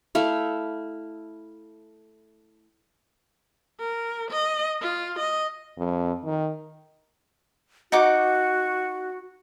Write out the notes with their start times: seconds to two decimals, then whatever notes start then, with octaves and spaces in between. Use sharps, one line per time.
0.15 A3 E4 F5
3.80 A#4
4.31 D#5
4.82 F4
5.19 D#5
5.78 F2
6.24 D#3
7.92 D#4 F#4 F#5 D6